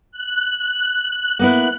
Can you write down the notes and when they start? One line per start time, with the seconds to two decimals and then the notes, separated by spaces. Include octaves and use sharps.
0.11 F#6
1.39 A#3 B3 E4